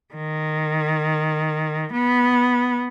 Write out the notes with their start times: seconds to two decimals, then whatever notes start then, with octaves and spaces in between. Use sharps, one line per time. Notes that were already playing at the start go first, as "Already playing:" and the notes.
0.15 D#3
1.93 B3